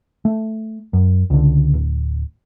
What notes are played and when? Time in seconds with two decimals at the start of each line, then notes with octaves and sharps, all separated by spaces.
0.25 A3
0.93 F#2
1.30 C#2 D3
1.74 D1